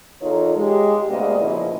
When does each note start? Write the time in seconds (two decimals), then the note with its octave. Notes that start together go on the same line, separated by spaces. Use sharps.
0.21 E2 D#4 F4 A4 A#4 C#5
0.57 G#3 G4
1.09 D2 C3 A#3 B3 D5 D#5
1.38 A#2 C#3 F3 E4 D#5